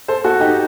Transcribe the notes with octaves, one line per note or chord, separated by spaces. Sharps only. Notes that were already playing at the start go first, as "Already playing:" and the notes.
A4 C5
F#4 A4
D#4 G4